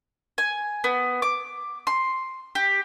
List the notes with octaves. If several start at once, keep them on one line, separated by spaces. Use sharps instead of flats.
G#5
B3
D6
C6
G4